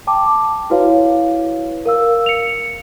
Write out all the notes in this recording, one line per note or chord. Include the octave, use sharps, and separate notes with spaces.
G5 A5 D6
E4 F#4 B4 C#5 F5
A#4 F5 E6
C#7 F7